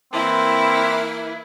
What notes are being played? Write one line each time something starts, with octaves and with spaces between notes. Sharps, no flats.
E3 A#3 C4 E4